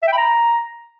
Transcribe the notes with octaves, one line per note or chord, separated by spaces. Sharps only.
E5
G5
B5
A#5